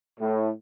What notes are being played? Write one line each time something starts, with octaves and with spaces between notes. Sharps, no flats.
A2